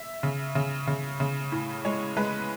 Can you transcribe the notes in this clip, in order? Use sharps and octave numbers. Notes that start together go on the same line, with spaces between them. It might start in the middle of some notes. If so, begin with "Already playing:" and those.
Already playing: E5
C#3
C#3
C#3
C#3
A2
G#3 C#5
G#3 B4